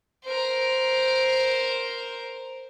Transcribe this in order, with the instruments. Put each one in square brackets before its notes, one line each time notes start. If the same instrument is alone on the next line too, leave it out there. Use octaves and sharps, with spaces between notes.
[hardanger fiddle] A#4 C5